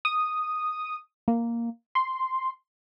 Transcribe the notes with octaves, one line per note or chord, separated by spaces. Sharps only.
D#6
A#3
C6